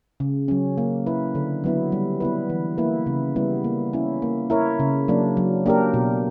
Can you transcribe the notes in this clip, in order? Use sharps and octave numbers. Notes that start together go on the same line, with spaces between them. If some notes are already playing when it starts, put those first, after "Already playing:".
C#3
F#3 C#4
A#3
E4 B4
D3
F#3 B3 E4
G3
B3 E4 B4
E3
A#3 E4 B4
C#3
G3 B3 E4
A#3
C#4 E4
A#3
E4 A#4 C#5
C#3
F#3 A#3 D4
F#3
A#3 D4 G4 A#4
B2